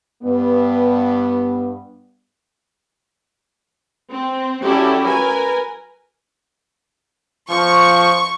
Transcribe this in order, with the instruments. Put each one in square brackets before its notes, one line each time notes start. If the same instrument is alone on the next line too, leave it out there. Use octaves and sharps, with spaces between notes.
[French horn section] G2 B3
[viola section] C4
F#3 C#4 E4 G4 A4 D5
A#4 B4 G#5
[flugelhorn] F3 [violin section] C#6